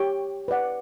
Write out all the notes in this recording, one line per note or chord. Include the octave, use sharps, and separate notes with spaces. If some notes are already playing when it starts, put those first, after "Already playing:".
Already playing: G4 C#5 G5 C#6
B4 D5 F#5